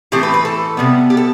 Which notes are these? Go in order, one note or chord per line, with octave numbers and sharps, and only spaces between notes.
A2 E3 A3 C4 G4
B4
B4
A4
C3 G3 B3
G4
A4